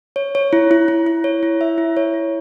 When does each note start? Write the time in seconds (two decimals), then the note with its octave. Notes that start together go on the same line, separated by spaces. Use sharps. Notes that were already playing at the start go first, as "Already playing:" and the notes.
0.16 C#5
0.35 C#5
0.53 E4
0.71 E4
0.88 E4
1.06 E4
1.24 C#5
1.43 E4
1.61 E5
1.78 E4
1.97 C#5
2.14 E4